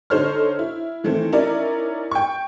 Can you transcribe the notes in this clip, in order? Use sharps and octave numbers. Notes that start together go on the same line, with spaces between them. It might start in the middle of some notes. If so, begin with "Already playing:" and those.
D3 D#4 A4 C5 C#5 F6
E4
D#3 E3 A3 C4
C#4 D#4 E4 A#4 D5
G5 C#6